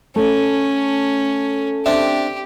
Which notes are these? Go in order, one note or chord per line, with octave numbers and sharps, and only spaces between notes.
A3 C#4
C4 D4 G4 E5